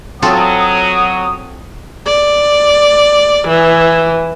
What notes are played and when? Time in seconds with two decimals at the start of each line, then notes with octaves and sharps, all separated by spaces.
0.22 F#3 C4 F4 A4 D#6
2.06 D5
3.48 E3